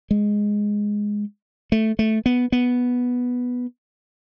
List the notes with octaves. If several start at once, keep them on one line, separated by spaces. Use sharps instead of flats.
G#3
A3
A3
B3
B3